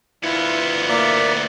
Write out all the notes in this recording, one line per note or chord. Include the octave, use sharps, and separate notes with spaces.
D2 B3 E4 F4
A#3 F4 D5 E5